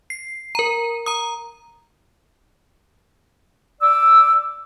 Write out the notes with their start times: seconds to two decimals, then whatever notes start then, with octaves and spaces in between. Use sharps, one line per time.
0.10 C7
0.55 A#4 A#5
1.06 A#5 D#6
3.82 D5 D6 E6